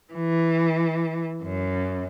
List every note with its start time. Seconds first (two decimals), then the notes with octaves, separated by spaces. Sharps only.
0.13 E3
1.43 F#2